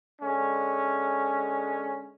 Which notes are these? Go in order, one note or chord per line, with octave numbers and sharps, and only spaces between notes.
D3 G#3 C#4